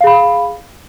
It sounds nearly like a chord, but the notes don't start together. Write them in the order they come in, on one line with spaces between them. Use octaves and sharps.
F5 G#4 B5